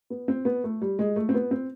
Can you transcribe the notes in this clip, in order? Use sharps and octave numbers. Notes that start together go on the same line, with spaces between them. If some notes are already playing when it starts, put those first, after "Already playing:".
B3
C4
B3
A3
G3
G#3
A3
C4
B3
C4